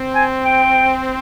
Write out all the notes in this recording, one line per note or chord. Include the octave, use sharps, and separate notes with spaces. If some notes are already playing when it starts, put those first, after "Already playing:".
Already playing: C4
G#5
G5